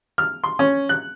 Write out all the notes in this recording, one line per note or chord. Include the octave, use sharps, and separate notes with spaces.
F6
C6
C#4
F#6